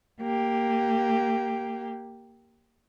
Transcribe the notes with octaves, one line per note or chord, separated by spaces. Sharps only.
A#3 G4